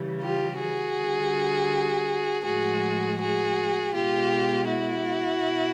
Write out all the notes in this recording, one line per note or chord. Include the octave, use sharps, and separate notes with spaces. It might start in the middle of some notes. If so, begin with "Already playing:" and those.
Already playing: C#3 E3 G3
F4 G4
F#4 G#4
D3 G3
A2 F3 G#3 F#4 G#4
F#4 G#4
B2 G#3 F4 G4
E4 F#4
B2